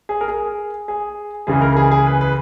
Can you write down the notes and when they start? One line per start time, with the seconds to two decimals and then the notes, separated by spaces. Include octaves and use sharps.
0.09 G#4
0.21 A#4
0.28 G#4
0.88 G#4
1.47 C#2 C#3 E3 G#4
1.62 A#4
1.77 G#4
1.91 G#4
2.06 B4
2.21 B4